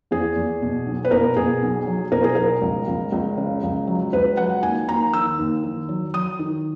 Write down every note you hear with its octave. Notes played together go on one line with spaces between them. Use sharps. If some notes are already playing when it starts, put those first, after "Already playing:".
E2 G#4
E2
B2
B1
B4
B2 A#4
B2 G#4
B1
F#3
B2 A#4
G#4
B1 A#4
C#2
C#2
C#2
C#3
C#2
F#3
C#2 B4
F#3 F#5
D#2 G#5
D#2 A#5
D#3 E6
D#2
D#3
F#3
F#3 D#6
D#3